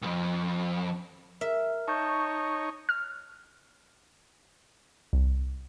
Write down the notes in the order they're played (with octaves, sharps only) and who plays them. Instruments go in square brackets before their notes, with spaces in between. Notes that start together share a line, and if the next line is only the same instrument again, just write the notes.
[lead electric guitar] C2 F2
[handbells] A#4 [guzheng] E5
[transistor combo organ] D#4 C#5 [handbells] A5 C#6 G6
[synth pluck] F6
C2